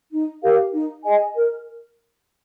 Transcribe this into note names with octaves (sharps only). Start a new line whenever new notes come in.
D#4
G4 A#4 F5
D#4
G#4 D#5 G#5
A#4